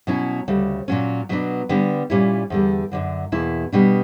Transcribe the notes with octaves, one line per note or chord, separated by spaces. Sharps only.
B2 F#3 C#4 E4
D2 C#3 G3
A#2 F#3 C#4
B2 F#3 B3 D4
D3 G3 B3 D4
A#2 G3 C#4 E4
E2 D3 G3
F#2 D3 F#3
E2 B2 A#3 E4
B2 G3 B3 D4